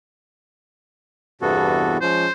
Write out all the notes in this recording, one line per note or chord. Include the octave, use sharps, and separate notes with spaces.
E2 G2 C3 B3 F#4 A4
F3 G#3 C#4 C5